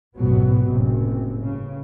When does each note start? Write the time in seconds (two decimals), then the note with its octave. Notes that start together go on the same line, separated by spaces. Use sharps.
0.16 A1 F2 G#2 B2 F#3 B3
0.67 F#1 A2 C3
1.42 G2 C#3